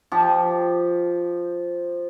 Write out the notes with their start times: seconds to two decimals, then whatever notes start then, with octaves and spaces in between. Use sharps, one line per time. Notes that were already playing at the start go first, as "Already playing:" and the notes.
0.12 F3 G4